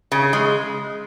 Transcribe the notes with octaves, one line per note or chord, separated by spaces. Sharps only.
C#3
G#3